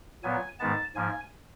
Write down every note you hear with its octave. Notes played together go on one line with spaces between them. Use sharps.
A#2 F#3 B3 G#5
G#2 D#3 G#3 B3 A5
G#2 F3 A#3 G#5